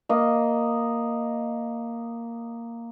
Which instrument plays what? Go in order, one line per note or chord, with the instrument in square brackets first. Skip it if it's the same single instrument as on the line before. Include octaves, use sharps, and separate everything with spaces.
[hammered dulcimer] A#3 D#5